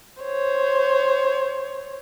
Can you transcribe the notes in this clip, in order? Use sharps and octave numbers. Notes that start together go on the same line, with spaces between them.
C5 C#5